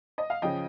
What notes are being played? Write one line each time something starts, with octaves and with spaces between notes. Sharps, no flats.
D#5
F5
C#3 F3 D#5 G5